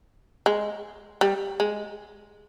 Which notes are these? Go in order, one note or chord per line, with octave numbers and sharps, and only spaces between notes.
G#3
G3
G#3